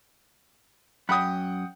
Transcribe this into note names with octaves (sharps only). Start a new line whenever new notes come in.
F#2 F#5 G5 B5 D#6